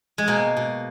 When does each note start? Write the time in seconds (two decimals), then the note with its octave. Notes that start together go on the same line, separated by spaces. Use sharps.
0.18 G#3
0.28 B2 A#3
0.57 B2